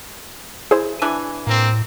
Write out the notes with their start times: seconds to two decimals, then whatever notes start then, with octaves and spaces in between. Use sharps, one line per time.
0.71 E4 G#4 C5
1.02 E3 D4 G#5
1.47 A2 A#3 C4